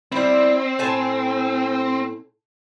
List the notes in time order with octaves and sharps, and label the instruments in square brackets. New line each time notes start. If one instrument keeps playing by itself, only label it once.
[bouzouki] G3 E4 [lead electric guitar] C4
[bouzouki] A2 G#5 A5